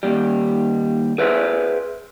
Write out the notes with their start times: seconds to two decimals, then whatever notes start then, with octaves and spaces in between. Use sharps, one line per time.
0.03 D#2 G3
1.18 G#4 B4 C5 E5